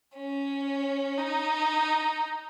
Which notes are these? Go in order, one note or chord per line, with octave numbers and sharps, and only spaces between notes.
C#4
D#4